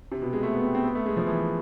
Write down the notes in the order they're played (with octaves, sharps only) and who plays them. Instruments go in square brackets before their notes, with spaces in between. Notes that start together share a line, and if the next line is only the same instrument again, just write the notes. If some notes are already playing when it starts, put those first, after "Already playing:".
[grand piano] C3
B2
G#3
A3
B3
C4
C4
B3
A3
G#3
F3
E3